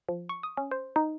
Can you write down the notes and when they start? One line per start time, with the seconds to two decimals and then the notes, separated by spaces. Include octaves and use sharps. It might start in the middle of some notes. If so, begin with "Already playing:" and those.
0.09 F3
0.29 C#6
0.43 D#6
0.57 C#4
0.71 C5
0.96 D#4